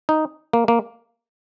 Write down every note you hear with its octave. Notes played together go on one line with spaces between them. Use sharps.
D#4
A#3
A#3